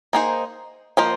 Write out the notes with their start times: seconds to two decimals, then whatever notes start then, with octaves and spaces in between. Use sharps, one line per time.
0.13 A#3 D#4 G#4 C5
0.97 F3 A#3 F4 C5 D#5